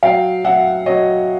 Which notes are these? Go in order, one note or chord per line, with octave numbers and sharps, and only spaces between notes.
F#3 F5 G5
F#3 E5 F#5
F#3 C#5 D#5